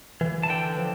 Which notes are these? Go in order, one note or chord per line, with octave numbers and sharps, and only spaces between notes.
E3
A5
D3 G5
F3